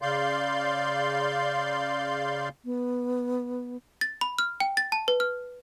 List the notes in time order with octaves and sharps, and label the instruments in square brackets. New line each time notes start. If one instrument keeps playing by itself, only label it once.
[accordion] C#3 D5 F5 C6 G6
[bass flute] B3
[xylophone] A6
B5
F6
G5
A6
A5
B4
F6